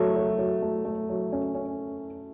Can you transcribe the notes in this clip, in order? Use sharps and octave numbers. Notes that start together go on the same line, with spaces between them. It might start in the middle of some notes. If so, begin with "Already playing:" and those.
Already playing: F#3 A3
F#3
F#3
A3
A3
F#3
C#4
C#4